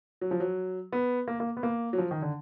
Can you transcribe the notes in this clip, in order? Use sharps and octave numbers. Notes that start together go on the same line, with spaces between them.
F#3
F3
F#3
B3
A#3
A#3
B3
A#3
F#3
F3
D#3
D3